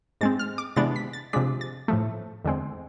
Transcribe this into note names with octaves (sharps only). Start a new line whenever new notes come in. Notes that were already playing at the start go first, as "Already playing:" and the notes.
G#2 G#3 C4 A6
F6
D6
C3 E3 G#3 B3 D4 A6
B6
A6
C3 F3 G#3 D4 B6
A6
A2 F3 A3
E2 D3 G#3 C4